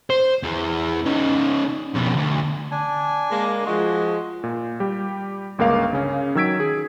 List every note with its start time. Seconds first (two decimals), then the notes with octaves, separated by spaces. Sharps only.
0.10 C5
0.43 E2 E3
1.06 C#3 D#4
1.94 F2 B2
2.16 D2
2.71 D4 G#5
3.31 G#3 A#3
3.66 F3 G#3 F#4
4.44 A#2
4.80 G3 G4
5.58 G1 C#2 A#3 A#4 F5 D6
5.93 C#3 C#4
6.35 D#3 F#3 E6 G#6 B6 D7
6.60 G#4